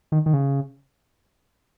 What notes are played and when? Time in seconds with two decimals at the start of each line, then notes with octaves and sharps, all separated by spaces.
0.12 D#3
0.26 D#3
0.33 C#3